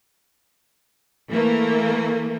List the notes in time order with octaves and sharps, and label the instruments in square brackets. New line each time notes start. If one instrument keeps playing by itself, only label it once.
[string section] E3 A3 A#3